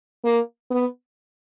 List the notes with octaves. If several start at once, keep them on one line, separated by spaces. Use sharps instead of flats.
A#3
B3